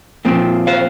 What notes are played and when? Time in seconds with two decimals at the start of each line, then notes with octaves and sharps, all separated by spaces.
0.25 A#2 F3 C4
0.67 C5 F5